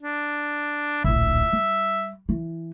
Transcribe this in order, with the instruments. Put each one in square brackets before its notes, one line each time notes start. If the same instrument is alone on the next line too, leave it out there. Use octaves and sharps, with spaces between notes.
[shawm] D4
[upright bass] D1 A#1 [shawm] E5
[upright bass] G3
E3